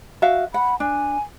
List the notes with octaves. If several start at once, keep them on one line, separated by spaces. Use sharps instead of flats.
F#4 E5 F5
F#5 B5
D4 G#5